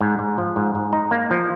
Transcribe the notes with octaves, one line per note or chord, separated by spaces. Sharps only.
G#2
G#2
F3
G#2
G#2
D#4
A#3
F3